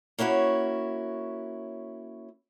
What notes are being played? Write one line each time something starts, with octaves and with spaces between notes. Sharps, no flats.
A#3 C#4 E4 F#4 C#5